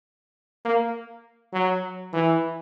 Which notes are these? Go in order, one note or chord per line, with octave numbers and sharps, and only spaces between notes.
A#3
F#3
E3